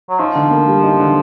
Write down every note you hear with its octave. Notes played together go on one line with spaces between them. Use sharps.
F#3
F3 D#4
D3
A#3
G3
D#4
D3